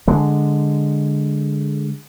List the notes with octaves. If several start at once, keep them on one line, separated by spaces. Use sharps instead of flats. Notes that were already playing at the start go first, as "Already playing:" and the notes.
D3 G#3